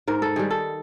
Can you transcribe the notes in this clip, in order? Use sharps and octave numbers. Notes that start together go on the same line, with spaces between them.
G#2 A#4
A4
D#3 G3 G#4
A4